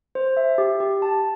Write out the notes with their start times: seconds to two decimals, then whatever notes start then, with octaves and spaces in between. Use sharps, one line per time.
0.15 C5
0.37 E5
0.58 G4
0.80 G4
1.02 A5